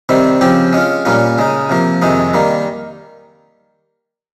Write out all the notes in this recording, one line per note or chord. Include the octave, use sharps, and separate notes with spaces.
C3 D#3 G3 C4
C#3 F3 C4 G4
G#3 C#4 F4
A#2 G3 A#3 C#4 F4
C#3 G#3 D#4
C3 F3 A#3
F2 C3 D#3 G#3 D#4
D#3 G3 A#3